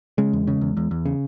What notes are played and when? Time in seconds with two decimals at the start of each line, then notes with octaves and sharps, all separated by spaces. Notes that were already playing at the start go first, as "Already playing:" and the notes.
0.18 C#3 G#3
0.33 E2
0.47 C#3
0.61 E2
0.77 E2
0.91 E2
1.06 C#3